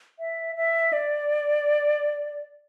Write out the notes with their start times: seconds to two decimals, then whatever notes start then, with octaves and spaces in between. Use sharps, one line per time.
0.19 E5
0.56 E5
0.93 D5